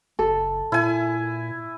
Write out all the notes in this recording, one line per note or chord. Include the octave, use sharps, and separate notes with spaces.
F#1 A4
A#2 E4 G#5